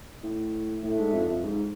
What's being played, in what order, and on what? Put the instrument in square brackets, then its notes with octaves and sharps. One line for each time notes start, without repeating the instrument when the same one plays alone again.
[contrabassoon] A2
[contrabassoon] A2 [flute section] D4 A4 E5
[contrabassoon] G#2
F2
F2
G#2